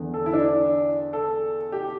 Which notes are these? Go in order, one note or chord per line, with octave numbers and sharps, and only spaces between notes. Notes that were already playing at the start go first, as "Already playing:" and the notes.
Already playing: E2 D3
A4
E4
D4
A4
G4